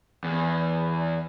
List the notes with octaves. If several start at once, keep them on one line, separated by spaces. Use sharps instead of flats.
E2